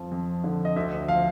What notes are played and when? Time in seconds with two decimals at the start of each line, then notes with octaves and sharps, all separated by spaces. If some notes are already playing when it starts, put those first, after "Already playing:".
Already playing: F2 F3
0.11 F2
0.44 D3
0.65 D#5
0.76 D2 E5
1.08 F3 F5